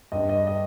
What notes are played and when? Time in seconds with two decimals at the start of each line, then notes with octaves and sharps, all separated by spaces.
0.12 G2 D3 D#5
0.29 D#5
0.47 D#5